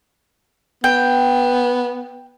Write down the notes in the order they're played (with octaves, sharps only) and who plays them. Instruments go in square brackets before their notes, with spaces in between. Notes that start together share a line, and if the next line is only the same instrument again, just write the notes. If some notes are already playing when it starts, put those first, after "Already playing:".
[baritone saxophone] B3 [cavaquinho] G5